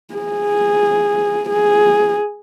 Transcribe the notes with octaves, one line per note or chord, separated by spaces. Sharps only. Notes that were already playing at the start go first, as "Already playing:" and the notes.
G#4
G#4